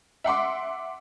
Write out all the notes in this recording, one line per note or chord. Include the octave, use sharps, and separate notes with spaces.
E5 F#5 C6 D6